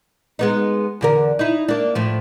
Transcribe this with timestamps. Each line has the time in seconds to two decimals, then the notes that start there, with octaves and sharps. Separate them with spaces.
0.39 G#3 B3 D#4
1.01 E2 D3 A#4
1.39 D#4 E4
1.68 A#3 D4
1.95 A2 F3